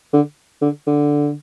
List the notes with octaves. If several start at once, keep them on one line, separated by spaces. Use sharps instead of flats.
D3
D3
D3